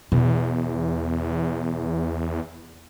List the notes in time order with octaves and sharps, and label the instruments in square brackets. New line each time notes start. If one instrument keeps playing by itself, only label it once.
[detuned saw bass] E2 [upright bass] B2